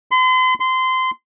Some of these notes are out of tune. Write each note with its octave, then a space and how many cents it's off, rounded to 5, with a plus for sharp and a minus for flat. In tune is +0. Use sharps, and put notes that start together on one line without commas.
C6 -40
C6 -20